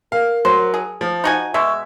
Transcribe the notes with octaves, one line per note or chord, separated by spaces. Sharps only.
A#4 F5
F#3 C5
G#4
F3 C5
D#4 F#4 G#5
B2 G#3 E5 C#6